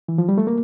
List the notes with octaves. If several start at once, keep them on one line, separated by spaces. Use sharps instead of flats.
E3
F3
G3
A3
A#3